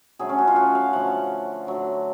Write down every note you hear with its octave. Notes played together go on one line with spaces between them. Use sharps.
D3 F#3 A3 G#4
C#4
F#4
F4
F#4
F5
D3 F3 A3 F#5
D3 F#3 A3